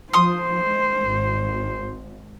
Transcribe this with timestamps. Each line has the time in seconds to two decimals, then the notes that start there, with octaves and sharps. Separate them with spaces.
0.13 F3 C5 C6 D#6
0.66 G#3
1.08 G#1